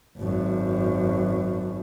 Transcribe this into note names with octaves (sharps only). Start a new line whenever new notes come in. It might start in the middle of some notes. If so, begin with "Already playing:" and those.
G#1 F#2